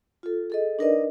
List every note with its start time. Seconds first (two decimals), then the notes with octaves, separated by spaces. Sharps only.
0.23 F4 A4
0.50 G#4 A4 D#5
0.79 D4 D#4 A#4 B4 D5 D#5